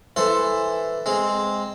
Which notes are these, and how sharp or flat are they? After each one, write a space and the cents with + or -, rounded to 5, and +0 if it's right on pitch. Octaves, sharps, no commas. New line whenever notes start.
E3 +0 A4 +5 C5 +0
G#3 -10 C4 +0